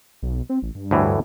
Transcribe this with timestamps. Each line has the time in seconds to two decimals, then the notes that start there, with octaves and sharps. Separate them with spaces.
0.22 B1
0.50 C4
0.62 A1
0.75 G2
0.91 D2 A2 E3